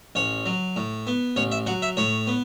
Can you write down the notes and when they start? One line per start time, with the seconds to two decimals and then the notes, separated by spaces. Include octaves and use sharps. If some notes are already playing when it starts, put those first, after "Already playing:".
0.15 A1 C#5
0.46 F#3
0.76 A2
1.07 B3
1.36 A1 C#5
1.52 E5
1.66 F#3 F#5
1.82 E5
1.97 A2 C#5
2.27 B3